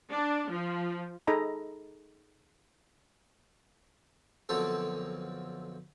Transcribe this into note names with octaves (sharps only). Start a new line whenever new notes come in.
D4
F3
D#4 G#4 A4 D#5 A#5 B5
B1 F#2 D3 F3 C4 A4